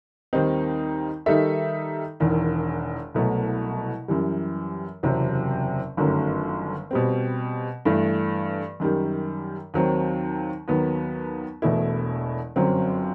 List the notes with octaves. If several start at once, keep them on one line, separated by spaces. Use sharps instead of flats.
D#2 D#3 G3 C4 D#4
D#3 G3 D#4 A4 E5
E1 E2 D#3
C2 B2 F#3 A3
F#2 E3 G3
F#1 E2 C3 F#3 C4
G1 F#2 D#3 F#3 A3
B2 G3 C4
G2 E3 A3
F#2 D#3 G3
D#2 D#3 F#3 C4
D#2 D#3 F#3 B3
E1 E2 B2 A3 E4
G1 F#2 F#3 C4